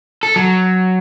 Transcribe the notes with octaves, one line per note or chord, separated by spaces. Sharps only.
A4
F#3